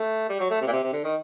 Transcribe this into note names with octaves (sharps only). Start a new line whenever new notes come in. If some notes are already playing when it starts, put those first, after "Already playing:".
Already playing: A3
G3
F#3
A3
C3
A#2
C3
C3
D3
D#3